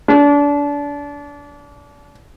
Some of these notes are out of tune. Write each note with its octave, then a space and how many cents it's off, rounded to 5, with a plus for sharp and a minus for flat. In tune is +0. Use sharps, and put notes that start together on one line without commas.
D4 -30